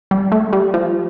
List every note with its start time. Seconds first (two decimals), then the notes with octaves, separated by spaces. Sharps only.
0.11 G3
0.32 A3
0.53 G3
0.74 F3